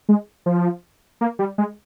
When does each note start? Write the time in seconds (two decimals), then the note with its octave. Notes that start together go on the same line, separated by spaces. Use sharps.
0.09 G#3
0.46 F3
1.21 A#3
1.39 G3
1.58 G#3